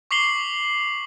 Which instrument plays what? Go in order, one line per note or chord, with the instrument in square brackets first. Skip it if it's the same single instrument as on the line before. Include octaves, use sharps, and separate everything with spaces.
[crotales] C#6 D6 B6 C7 F#7 G7